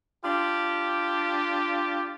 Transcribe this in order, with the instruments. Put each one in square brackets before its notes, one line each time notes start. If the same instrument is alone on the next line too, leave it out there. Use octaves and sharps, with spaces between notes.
[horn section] D4 F4 G4